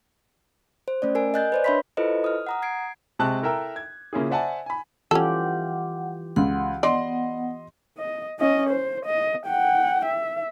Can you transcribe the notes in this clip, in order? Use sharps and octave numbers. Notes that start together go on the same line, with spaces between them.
C5
A3 C#4 D5
A#4 G#5
D#5 G#5 F#6 G6 A6
B4 C5 D5
D4 C#5 E5 B5 C6 B6
E4 F4 A4 B4 C5 D#5
D#6 F6
F#5 A#5 D#6
G#6 C7 D7
C3 G#3 C4 A5 C#6 F#6
E4 A4 A#4 E5 G5 A#5
G#6
C#3 A#3 C#4 E4 F4 G#4
C5 D5 E5 F#5 G#5 A5
G#5 B5
E3 C#4 F4 G4 A4 F#5
C#2 F#5 C6
B3 D5 D#5 F#5 C6
D#5
C#4 D#5
C5
D#5
F#5 G5
E5